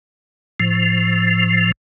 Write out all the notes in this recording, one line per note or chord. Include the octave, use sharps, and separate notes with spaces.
A2 F3